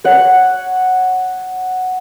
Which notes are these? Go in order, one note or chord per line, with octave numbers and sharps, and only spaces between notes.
C#5 F#5